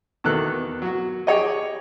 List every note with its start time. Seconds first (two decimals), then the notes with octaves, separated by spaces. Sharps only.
0.24 E2 B2 D#3 A4 F#6
0.82 F#3 F#4
1.27 G4 G#4 C#5 D#5